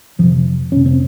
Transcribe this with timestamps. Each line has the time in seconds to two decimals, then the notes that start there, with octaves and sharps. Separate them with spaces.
0.19 F2 F3
0.23 C3
0.72 F2 C3 C#4
0.86 C4